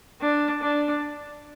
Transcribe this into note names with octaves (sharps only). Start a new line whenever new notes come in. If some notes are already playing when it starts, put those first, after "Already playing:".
D4
D4